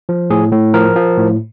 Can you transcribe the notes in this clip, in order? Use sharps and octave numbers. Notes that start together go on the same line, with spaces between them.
F3
A2 G#4
A2
F3 A#4
F3
A2